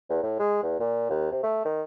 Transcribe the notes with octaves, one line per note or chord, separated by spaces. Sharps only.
E2
A2
G#3
E2
A#2
D#2
C3
A3
D#3